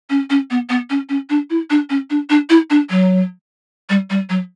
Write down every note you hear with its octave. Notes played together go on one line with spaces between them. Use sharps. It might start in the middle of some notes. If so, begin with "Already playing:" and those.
C#4
C#4
B3
B3
C#4
C#4
D4
E4
D4
C#4
D4
D4
E4
D4
F#3
G3
G3
F#3